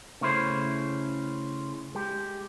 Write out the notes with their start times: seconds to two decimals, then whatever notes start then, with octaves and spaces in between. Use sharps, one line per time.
0.21 C#3 A3 C#4 E4 C5
1.95 G#3 G4